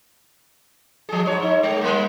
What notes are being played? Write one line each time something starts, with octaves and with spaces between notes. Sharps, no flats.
F3 G#4
G#2 C#5
D#4
G#3
G3 A#3